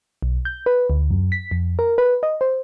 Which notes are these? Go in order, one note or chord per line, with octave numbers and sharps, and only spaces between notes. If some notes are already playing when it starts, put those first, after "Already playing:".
B1
G6
B4
D2
F#2
B6
F2
A#4
B4
D#5
C5